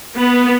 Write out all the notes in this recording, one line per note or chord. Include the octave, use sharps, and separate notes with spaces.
B3